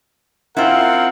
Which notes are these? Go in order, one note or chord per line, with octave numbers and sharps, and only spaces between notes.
C4 E4 F4 A#4 F#5